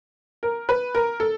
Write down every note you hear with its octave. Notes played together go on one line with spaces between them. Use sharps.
A#4
B4
A#4
A4